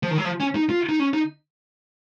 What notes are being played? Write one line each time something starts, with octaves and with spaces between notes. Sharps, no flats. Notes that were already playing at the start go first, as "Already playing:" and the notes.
F3
D#3
F#3
F3
C#4
D#4
F4
D#4
C#4
D#4